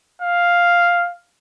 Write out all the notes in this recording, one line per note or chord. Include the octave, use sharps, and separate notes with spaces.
F5